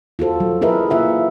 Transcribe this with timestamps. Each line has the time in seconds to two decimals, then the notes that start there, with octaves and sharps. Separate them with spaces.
0.19 F4 F#4 A4 C5
0.40 F#3
0.61 E4 G#4 A#4 B4 D#5 E5
0.90 A#3 E4 F4 E5 F#5